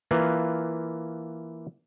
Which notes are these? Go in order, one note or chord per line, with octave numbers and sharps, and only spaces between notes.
E3 A#3 F4 B4